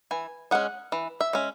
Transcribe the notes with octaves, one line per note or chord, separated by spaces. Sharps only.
E3 G#5
G#3 C#4 F#5
E3
E5
G#3 C#4